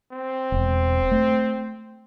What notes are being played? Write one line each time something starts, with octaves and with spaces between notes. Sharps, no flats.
C4
E1
A3